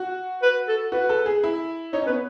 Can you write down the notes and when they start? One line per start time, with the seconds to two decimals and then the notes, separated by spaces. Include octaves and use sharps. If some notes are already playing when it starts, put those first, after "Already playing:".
Already playing: F#4
0.42 B4
0.68 A4
0.92 F#4 B4
1.09 A4
1.26 G#4
1.44 E4
1.93 D#4 C#5
2.01 C#4
2.06 B3 B4